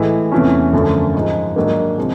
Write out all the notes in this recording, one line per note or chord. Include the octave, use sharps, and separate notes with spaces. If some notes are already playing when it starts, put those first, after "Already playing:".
Already playing: A2 E3 G#3
E2 C3 E3 A3 C#4
F#2 D3 F3 A3 C#4
G#2 F3 G#3
G#2 D#3 F#3 A#3 D4
C3 F3 G#3